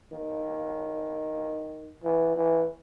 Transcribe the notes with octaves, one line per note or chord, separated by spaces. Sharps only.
D#3
E3
E3